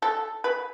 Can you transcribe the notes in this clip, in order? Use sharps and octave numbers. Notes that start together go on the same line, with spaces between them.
A4
B4